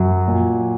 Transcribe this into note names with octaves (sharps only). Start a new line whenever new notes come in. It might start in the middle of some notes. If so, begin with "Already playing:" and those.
Already playing: F#2 F#3
A#2